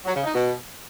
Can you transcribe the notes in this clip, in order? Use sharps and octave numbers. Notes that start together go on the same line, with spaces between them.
F#3
C#3
D#4
B2